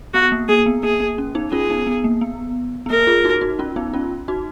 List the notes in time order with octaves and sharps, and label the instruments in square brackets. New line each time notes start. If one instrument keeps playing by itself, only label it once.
[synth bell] B3 [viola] F#4
[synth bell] A#3
[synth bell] A#3 [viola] G#4
[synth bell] B3
[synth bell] A#3 [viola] G#4
[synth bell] A#3
C#4
B3 D#4
[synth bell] C#4 F4 [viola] G#4
[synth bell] B3 D#4
B3
A#3
B3
B3
[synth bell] A#3 [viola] A#4
[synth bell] F4 G#4
D#4 F#4
D#4 F#4
C#4 F4
B3 D#4
C#4 F4
D#4 F#4